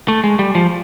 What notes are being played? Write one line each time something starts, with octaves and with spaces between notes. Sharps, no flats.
A3
G#3
G3
F3